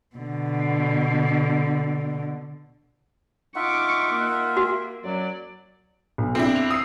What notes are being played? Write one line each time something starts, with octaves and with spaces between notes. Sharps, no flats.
B2 D3
D#4 F4 E5 F#5 C#6 D6
A#3
F#4
F#2 F#3 D5
B1
C4 D4 E4
F7
D#6 E6 C7